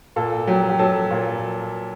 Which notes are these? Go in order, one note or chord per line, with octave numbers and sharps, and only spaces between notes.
A#2 A4
F#3 G4
G4
F#3 A4
A#2